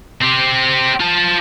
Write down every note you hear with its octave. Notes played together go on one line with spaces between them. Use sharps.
C4 G4
F4 A5